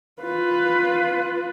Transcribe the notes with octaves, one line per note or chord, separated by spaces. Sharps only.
F4 B4